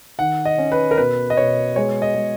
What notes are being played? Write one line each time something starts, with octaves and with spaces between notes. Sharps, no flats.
D#3 F#5
D#5
C#4
B4
A#4
B2 B4
D#5
B2 C#5
G#3 C#5
D#5
G#3